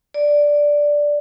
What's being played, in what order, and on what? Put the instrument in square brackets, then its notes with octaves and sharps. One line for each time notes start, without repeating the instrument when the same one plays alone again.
[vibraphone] D5